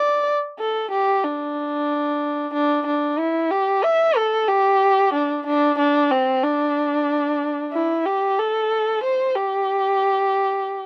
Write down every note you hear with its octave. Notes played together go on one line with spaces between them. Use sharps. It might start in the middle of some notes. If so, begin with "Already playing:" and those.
Already playing: D5
A4
G4
D4
D4
D4
E4
G4
E5
A4
G4
D4
D4
D4
C4
D4
E4
G4
A4
C5
G4